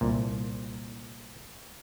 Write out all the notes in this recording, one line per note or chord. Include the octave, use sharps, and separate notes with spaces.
C2 A#2